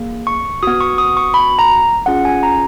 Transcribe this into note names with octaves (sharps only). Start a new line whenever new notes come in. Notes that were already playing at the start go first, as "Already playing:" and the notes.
Already playing: A#3 G#4
C#6
B3 F#4 D#6
C#6
D#6
C#6
B5
A#5
C#4 F4 G#4 F#5
G#5
A#5